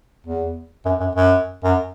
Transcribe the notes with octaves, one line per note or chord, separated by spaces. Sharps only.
E2
F#2
F#2
F#2
F#2